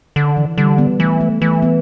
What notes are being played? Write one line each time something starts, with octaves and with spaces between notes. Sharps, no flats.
D3
E3
D3 G3
B3
E3 A3
A3
E3 A3
B3